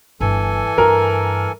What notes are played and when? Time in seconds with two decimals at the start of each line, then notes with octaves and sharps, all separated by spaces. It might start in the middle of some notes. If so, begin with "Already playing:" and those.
0.21 G1 E3 A4 G#5
0.78 G2 A#4